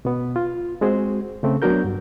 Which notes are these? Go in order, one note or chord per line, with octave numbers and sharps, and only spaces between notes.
B2 B3
F4
G#3 C4 F#4 G#4 C5
C#3 A3 C4
F#3 B3 D4 F#4 A#4 G6
G2